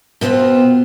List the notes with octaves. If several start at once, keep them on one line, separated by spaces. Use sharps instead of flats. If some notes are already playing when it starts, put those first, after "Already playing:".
B2 B3 C4 F4